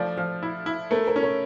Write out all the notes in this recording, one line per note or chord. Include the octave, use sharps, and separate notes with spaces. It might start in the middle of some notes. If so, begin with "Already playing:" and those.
Already playing: F3 A3 D5
F3
E4
E4
A3 A#4
A#4
C#4
C#5